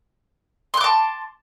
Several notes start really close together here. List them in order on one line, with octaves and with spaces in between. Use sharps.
C6 F#6 D6 A5